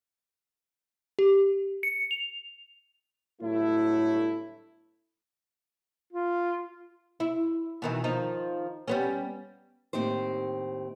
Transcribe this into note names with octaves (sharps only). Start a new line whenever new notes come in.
G4
C#7
F7
G1 A2 F#3 A3 E4
F4
E4
B2 D#3 E3
D#3 F3 D#4
G3 B3 C#4
D#2 A2 C4 D#4 G4 C5